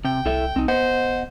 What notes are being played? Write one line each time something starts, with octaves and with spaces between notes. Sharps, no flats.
C3 G5
C2 E4 A4 E5
C2 C4 D#4
B3 C5 D#5 F#5